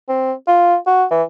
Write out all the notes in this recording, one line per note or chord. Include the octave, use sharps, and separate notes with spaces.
C4
F4
F#4
E3